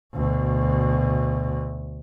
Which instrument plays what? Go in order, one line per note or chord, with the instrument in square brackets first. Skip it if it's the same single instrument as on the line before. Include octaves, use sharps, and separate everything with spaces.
[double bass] D2 B2